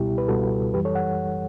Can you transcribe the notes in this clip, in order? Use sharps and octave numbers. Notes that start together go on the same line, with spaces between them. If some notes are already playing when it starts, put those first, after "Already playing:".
Already playing: C#2 B2 G3 E4 G4
B4
C#2 B2 G3 F#4 A4
F#2 E3 G3 G4 B4
A4 C#5
F#5